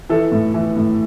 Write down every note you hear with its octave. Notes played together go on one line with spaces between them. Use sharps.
E3 A4
A2
E3
A2